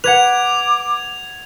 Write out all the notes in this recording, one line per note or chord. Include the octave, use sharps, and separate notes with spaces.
B4 F#5 D6 G#6 F7